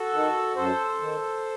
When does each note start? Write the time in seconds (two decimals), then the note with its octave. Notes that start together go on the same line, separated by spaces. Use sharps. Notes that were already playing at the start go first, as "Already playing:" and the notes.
Already playing: F#4 A4
0.13 D#3
0.56 F#2 A4 C5
1.01 D#3